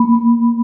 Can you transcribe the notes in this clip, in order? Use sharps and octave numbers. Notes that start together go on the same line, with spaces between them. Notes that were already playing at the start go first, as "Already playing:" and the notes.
Already playing: A#3 B5
A#3